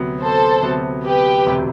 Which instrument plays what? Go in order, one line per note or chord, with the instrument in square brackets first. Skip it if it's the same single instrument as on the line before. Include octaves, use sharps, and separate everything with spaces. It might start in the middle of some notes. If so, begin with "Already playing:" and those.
Already playing: [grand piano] D2 C3 F#3 B3
[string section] A4 C5
[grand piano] D2 C3 F#3 B3
[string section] G4 B4
[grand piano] E1 D2 C3